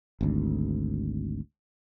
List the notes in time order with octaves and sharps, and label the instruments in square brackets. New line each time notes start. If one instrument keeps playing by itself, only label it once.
[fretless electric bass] G#1 D2